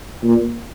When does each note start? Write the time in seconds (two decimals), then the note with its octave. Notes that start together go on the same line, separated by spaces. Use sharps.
0.23 A#2